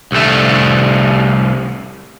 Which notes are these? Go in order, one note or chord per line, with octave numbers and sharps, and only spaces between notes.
C2 A3